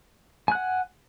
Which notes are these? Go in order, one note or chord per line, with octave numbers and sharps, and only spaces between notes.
F#5 G#5 F#6